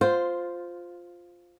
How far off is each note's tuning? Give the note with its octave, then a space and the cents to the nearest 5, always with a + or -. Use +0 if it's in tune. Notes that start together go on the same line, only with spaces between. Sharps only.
F4 +5 C5 -5